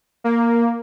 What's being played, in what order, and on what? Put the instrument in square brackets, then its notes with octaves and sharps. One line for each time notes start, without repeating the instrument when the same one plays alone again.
[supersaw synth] A#3